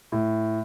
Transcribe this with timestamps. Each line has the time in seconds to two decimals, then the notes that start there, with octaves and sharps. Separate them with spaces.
0.12 A2